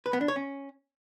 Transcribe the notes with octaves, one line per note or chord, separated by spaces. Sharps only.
B4
B3
D4
C#5
C#4